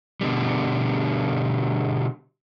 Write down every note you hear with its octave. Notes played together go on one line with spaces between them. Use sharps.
B2 D3 G3